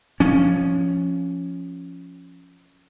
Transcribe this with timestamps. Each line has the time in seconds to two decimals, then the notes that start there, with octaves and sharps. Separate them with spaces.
0.20 F3 C#4